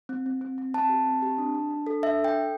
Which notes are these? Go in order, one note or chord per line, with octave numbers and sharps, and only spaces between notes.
C4
C4
C4
C4
C4 A5
G4
C4
G4
D4
D4
D4
A4
D4 E5
A4
G5
A4